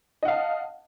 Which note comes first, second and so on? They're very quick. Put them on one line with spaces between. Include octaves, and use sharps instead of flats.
D#5 F#5 F5 A5